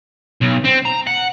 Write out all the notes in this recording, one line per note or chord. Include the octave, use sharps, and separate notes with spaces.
B1
C4
A#5
F#5